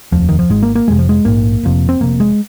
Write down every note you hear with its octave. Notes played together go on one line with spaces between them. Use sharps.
F1 D#2 F3
D#3
F3
G#1 G#2 G#3
A#3
A#3
F1 F2 C3 G#3
F3
G#3
A#1 G#2 A#3
F1 F2 C3
C4
F1 F2 C3 A#3
G#3